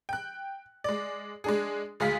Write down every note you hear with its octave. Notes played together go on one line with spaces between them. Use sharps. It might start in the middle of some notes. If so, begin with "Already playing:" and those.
G5 F#6
G#3 D5
G#3 D4 G#4
D2 G#3 G#4 F5 B6